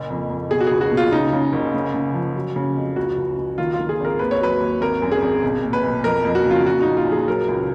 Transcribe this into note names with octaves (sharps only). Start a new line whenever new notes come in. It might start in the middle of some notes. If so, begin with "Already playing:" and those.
Already playing: F#1 A#2
F2
F2
B2 G#4
F#4
C#2 G#4
F#4
B2
F4
C#3 D#4
C#3
F#1
C#3
C#3
F3
F#3
C#3
F2
C#2 F#4
C#2
C#2
D#3 F4
F4
D#3
G#4
G#1 A#4
D#2 B4
C#5
F#3 B4
D#2
G#1 A#4
F#2
G#4
G#1
B1
A#2
B4
B1
F2 A#4
F2
F#4
C#3 F4
A#2 F#4
A#1 D#4
F4
A#1 G#4
F#3 A#4
C#2